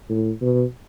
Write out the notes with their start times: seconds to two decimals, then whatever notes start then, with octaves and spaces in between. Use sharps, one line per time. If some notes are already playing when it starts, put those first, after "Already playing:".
0.10 A2
0.42 B2